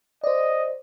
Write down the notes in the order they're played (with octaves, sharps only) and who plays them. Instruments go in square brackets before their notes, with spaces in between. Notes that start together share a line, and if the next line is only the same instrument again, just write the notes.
[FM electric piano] C5 D5 [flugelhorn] D#5